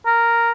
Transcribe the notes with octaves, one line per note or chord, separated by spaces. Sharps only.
A#4